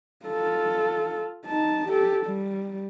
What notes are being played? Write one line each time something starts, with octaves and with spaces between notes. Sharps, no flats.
F4 A4
D#4 A5
G4 A4
G3